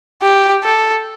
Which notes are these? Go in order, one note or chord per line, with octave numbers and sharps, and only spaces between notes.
G4
A4